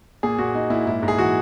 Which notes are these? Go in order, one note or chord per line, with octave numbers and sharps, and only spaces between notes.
A#2 G#4
A#2 F#4
A#2 D#4
A#2 E4
G#2 E4
G#2
G#4
E3 F#4